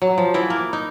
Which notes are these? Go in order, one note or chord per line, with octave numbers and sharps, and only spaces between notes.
F#3
F3
E3 B3 E4
A#3
D#4